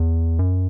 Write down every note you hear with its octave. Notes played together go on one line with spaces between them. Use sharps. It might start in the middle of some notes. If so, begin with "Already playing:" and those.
Already playing: E2
F#2